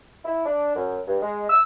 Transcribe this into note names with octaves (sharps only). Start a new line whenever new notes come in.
E4
D4
F#2
G2
G#3
E6